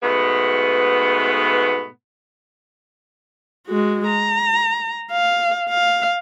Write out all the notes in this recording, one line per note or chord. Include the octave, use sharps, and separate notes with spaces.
G#2 B2 A3 B3
G#3 F#4
A#5
F5
F5